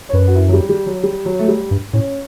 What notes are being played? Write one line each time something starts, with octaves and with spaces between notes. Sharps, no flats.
C#5
F#2 B4
F#4
E4
F#3
G3
G3
F#3
G3
F#3
A3
G3
G2
A2 C#4